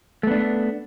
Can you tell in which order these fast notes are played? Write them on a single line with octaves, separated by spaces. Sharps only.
A3 B3 D4